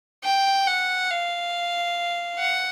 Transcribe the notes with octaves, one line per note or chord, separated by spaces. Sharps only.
G5
F#5
F5
F#5